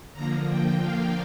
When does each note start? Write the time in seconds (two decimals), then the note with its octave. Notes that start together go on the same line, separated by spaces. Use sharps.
0.13 D3 F3 A#3 A#5
0.48 G5
0.82 F5